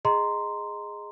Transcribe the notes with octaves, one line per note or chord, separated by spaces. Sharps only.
G#4 D#5 A#5 C6